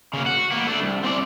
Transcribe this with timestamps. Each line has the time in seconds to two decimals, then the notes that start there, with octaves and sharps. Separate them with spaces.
0.14 C#3 A#3
0.26 F#4
0.52 A#3 B3
0.67 A3 D4
0.82 C2
1.04 C4 D5